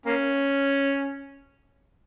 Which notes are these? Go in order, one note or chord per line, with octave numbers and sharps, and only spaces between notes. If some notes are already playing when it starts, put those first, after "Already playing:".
A#3 C#4